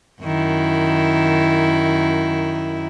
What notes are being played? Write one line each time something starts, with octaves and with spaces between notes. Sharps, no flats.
F#2 D#3 E4